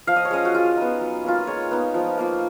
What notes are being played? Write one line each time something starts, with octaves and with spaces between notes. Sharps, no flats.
F3 F5
D#5
C#5
G#3 C#4 D#5
F#4
G#3 F4
B3 D#4
F#3
A#3 C#4 F4
G#3 C#5
B3 D#4
F3
A#3 F4